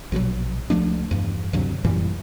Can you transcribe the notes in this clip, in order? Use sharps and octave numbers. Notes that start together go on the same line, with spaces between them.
A#1 B2 D3 F#3
C#2 F3 A3 D4
E2 G2
D2 G2 C3 F#3
F#2 A#2 E3 G3